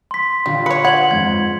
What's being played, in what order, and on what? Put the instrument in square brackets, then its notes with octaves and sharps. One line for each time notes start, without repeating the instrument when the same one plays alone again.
[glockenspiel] C6 B6
[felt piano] D3 F4 [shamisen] G3
[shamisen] B4 C#5 [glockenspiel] C#7
[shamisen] F#5 [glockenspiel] G#6 F#7
[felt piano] F2 G#2 [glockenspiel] G#6